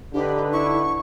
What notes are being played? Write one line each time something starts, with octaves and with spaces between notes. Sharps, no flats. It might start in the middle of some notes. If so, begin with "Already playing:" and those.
D3 D4 D#4 G4 B4
E4 C#6